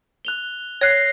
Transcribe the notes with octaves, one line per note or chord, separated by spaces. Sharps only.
F#6 F7 G7
C#5 F#6 A#6 C7